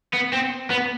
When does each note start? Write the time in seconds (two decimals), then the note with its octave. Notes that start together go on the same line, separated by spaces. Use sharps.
0.13 B3
0.33 C4
0.70 B3